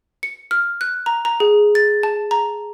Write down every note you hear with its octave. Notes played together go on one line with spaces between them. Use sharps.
C#7
F6
F#6
A#5
A#5
G#4
A6
A5
A#5